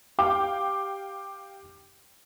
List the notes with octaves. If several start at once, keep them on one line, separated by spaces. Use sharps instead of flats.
G4 F5 G5 D6